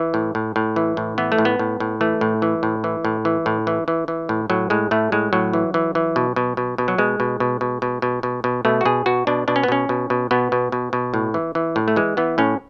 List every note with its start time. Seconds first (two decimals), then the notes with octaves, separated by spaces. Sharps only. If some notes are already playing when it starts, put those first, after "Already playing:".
Already playing: E3
0.14 A2
0.35 A2
0.56 A2
0.76 E3
0.97 A2
1.18 E3 B3
1.32 A3
1.38 A2
1.45 B3
1.59 A2
1.80 A2
2.01 E3 A3
2.21 A2
2.42 E3
2.63 A2
2.84 E3
3.05 A2
3.25 E3
3.46 A2
3.67 E3
3.88 E3
4.08 E3
4.29 A2
4.50 A2 F#3
4.70 A2 G#3
4.91 A2 A3
5.12 A2 G#3
5.33 A2 F#3
5.53 E3
5.74 E3
5.95 E3
6.16 B2
6.36 B2
6.57 B2
6.78 B2
6.88 F#3
6.98 B2 G#3
7.20 B2
7.40 B2
7.61 B2
7.82 B2
8.02 B2
8.23 B2
8.44 B2
8.65 B2 A3
8.81 F#4
8.85 B2 G#4
9.06 B2 F#4
9.27 B2 D4
9.48 B2 D4
9.56 C#4
9.63 B3
9.68 B2 C#4
9.89 B2
10.10 B2
10.31 B2 B3
10.52 B2
10.72 B2
10.93 B2
11.14 A2
11.34 E3
11.55 E3
11.76 A2
11.88 A3
11.96 E3 G#3
12.17 E3 B3
12.38 A2 C#4